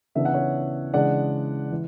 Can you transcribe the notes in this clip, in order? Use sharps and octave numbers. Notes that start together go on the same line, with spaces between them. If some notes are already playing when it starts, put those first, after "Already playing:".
C#3 E3 B3 D4 E5
F#5
C#5 E5
C#3 E3 G#3 D4 D5 F#5
E3